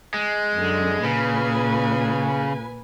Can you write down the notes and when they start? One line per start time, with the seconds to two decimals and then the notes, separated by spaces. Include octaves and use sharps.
0.14 G#3
0.54 F#2 D3
1.05 A#2 C#3 B4 G#5